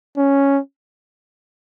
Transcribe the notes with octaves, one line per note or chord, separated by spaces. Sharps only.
C#4